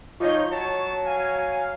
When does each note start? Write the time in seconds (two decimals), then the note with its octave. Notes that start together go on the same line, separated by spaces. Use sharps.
0.20 F3 D#4 F4 C#5 D#5 G6
0.51 F#3 C#5 A5
1.05 F5 G#5